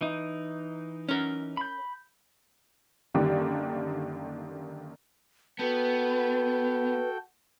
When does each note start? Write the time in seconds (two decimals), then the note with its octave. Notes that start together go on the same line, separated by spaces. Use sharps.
0.01 E3 D#4
1.09 C#4 A#4
1.57 B5 G6
3.14 F#2 D3 D#3 G3 A#3 D4
5.59 B3 F#4 A4 B4 G5